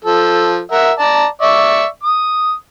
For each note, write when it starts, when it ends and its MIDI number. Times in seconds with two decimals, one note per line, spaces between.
0.05 0.61 53
0.05 0.61 69
0.72 0.91 70
0.72 0.91 76
0.72 0.91 78
0.99 1.25 74
0.99 1.25 81
0.99 1.25 82
1.42 1.85 74
1.42 1.85 76
1.42 1.85 85
2.03 2.53 87